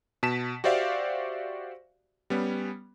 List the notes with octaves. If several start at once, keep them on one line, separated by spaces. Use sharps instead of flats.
B2 A5 B6 E7
F#4 G4 C5 D5 E5 F5
G3 B3 C#4